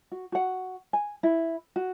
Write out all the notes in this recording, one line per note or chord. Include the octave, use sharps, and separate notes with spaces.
F#4
F#4 F#5
G#5
E4
F#4